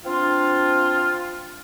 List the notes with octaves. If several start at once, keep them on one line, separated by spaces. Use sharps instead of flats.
C4 D4 F4